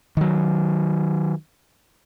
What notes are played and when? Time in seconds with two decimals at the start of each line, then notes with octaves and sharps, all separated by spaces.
0.17 D#3 F#3